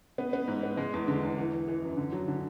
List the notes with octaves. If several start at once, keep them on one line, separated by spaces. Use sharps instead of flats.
B3
B3
G#2
B3
G#3
E2
D3
E2
E3
E3
E3
F#2
D3
F#3
D3